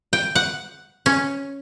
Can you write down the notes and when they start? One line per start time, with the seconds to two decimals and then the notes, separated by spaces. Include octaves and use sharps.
0.13 G5
0.35 F#5
1.06 C#4